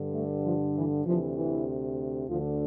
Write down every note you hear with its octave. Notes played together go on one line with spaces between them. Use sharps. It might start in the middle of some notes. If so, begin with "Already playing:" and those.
Already playing: G2 D3
A3
F3
E3
D2 C3 E3 F3
E3
D2 D3 F3